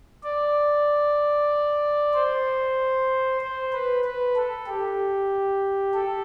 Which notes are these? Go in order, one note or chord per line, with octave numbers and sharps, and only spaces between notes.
D5
C5
C5
B4
B4
A4
G4
A4